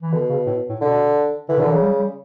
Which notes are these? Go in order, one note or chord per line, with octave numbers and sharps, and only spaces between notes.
E3
B2 D3
C#3
A2
A2
B2 D3
D3 E3
B2
D3
E3
C#3 F#3
G3
G3